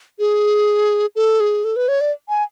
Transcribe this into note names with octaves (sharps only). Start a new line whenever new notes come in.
G#4
A4
G#4
A4
B4
C#5
D5
G#5